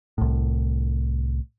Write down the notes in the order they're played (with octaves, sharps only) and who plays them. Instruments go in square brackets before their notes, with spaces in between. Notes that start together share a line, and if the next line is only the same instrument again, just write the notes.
[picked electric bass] C2 A2